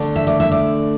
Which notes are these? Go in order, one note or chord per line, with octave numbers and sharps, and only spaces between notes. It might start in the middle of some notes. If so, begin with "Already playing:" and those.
Already playing: D3 A3 D4
E5
D5
E5
D5